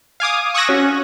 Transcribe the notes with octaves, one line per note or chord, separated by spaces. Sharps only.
F5 G#5 D6 D#6
C#6 D#6 E6 F#6 G#6 A#6
C#4 F#4